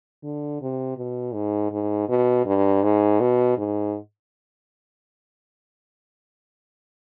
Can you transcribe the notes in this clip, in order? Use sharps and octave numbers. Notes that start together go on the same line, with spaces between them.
D3
C3
B2
G#2
G#2
B2
G2
G#2
B2
G#2